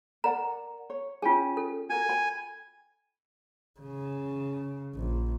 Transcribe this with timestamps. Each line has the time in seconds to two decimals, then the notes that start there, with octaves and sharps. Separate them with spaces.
0.24 A#4 D5 F#5 A#5
0.90 C#5
1.22 C#4 F4 G#4 G5 G#5
1.57 A4
1.90 F#4 A#4 G#5
2.09 G5 B5
3.80 C#3
4.95 A#1